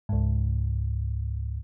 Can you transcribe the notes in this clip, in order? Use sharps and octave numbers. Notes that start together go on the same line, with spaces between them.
C#2 G#2